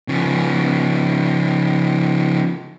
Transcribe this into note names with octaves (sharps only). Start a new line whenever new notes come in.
C#3 F3